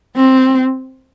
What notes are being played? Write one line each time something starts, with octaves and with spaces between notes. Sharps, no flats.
C4